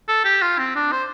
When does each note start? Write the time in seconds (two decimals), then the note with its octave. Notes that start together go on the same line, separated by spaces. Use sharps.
0.08 A4
0.25 G4
0.42 F4
0.59 C4
0.75 D4
0.92 C5